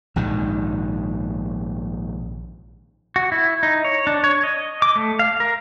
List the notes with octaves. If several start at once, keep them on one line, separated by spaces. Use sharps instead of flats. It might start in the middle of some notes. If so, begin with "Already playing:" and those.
A#1 G#2 D#3
F#4
E4
D#4
C#5
D4
C#5
D#5
D6
A3
F5
A#4